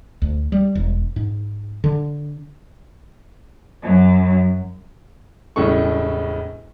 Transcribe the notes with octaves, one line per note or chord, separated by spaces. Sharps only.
D2
G3
E1
G#2
D3
F#2 F#3
E1 A2 C#3 G3 A4 C#6